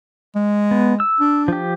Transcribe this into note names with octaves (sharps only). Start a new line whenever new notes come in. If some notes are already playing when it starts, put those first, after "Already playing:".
G#3
B3
E6
D4
F3 G4